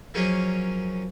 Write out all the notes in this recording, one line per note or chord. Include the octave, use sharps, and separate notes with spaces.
F3 F#3 A#3 C#4 G#4 D#5